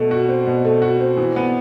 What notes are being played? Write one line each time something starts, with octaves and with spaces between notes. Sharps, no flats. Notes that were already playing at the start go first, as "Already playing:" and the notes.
Already playing: B2 A3
F#4
C4
B2
A3
F#4
C4
E3
B3